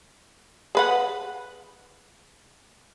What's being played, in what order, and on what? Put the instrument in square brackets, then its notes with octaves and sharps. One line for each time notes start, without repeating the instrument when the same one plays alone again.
[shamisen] G#4 B4 F#5